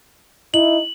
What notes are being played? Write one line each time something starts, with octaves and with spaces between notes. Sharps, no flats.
D#4 E4 F#7